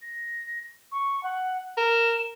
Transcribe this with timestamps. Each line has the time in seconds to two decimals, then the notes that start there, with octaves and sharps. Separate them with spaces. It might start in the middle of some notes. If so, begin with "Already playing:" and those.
0.02 A#6
0.92 C#6
1.23 F#5
1.78 A#4 E7